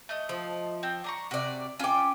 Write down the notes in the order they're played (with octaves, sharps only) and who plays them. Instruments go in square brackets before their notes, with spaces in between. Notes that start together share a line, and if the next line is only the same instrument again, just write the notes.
[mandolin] A3 D#5
[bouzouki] F3
[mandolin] C4 G5
D4 A#5 C#6
[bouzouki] C3 D5 [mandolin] F#4
[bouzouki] C#4 G5 [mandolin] F4 D6